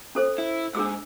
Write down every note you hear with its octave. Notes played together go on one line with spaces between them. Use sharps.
C#4 A4 C5
E4
G#2 D4 G#4 E6